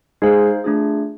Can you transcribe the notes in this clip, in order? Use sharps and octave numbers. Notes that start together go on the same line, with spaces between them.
G#3 D#4 G#4 C5 F5
A3 D4 F4 G#4